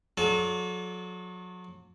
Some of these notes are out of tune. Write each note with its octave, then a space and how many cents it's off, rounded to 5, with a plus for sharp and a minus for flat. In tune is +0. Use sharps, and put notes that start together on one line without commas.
F#3 -35 A4 -35 D5 -45